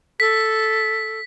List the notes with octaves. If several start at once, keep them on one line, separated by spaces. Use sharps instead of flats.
A4 B6